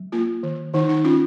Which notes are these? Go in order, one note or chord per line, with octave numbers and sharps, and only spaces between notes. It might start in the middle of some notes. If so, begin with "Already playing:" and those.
Already playing: F#3
A#3 F4
D#3
D#3 D#4
D#4
C#4 F4